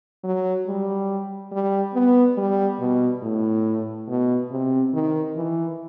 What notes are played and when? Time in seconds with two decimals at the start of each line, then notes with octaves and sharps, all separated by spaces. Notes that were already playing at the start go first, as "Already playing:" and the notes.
0.24 F#3
0.67 G3
1.52 G3
1.95 B3
2.37 G3
2.80 B2
3.23 A2
4.09 B2
4.51 C3
4.94 D#3
5.36 E3